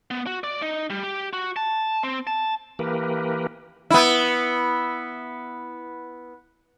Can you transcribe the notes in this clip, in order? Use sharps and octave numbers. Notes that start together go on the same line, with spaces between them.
B3
F#4
D5
D#4
G3
G4
F#4
A5
C4
A5
E3 A#3 G4 A#4 B4
B3 E4